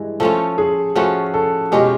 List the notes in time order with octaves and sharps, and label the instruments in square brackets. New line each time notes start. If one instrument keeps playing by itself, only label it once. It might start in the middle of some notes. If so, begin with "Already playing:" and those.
Already playing: [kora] G2 E3 G#3
[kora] F3 A3 C#4 F4 [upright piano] A4
[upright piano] G#4
[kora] F3 A3 C#4 F4 [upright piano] F#4
[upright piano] A4
[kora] B2 G#3 C#4 F4 [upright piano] G4